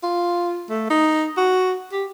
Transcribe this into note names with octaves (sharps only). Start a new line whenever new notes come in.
F4
A3
D#4
F#4
G4